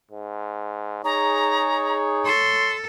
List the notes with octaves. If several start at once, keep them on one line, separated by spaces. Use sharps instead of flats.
G#2
D#4 G#4 C#5 A#5
A4 C6